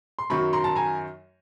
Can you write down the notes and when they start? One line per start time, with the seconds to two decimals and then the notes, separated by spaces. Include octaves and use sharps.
0.19 C6
0.30 F#2 D#3 F#3 B5 C#6
0.53 A#5 C6
0.64 A5
0.75 G#5 A#5